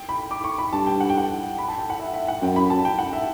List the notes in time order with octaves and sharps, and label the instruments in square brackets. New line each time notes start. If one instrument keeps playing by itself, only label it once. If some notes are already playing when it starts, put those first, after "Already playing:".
Already playing: [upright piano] G5
B5
D6
C#6
B5
[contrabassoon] G2 [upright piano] A5
[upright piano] G5
F#5
G5
F#5
B5
A5
G5
F#5
E5
E5
F#5
[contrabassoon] F#2 [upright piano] G5
[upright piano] B5
A5
G5
F#5
E5